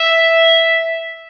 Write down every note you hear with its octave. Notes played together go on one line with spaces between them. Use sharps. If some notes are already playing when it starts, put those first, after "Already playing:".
Already playing: E5